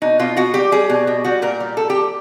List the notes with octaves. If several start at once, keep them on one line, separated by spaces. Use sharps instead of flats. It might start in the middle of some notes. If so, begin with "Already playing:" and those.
B2 D#4
B2 F4
B2 F#4
G3 G4
G3 G#4
B2
B2
G3 F#4
A#2 A#4
G3
G3 A4
G3 G4